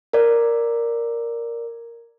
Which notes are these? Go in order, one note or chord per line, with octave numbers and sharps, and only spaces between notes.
A#4 D5